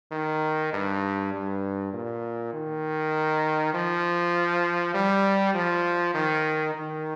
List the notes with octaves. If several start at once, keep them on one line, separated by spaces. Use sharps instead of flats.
D#3
G2
G2
A#2
D#3
F3
G3
F3
D#3
D#3